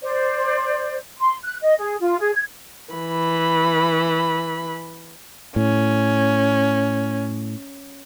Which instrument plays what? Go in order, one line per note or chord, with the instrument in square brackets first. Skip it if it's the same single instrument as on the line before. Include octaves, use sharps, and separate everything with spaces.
[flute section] C5 D5
C6
F#6
D#5
G#4
F4
G#4
G#6
[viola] E3 B5
[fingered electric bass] A2 [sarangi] C#4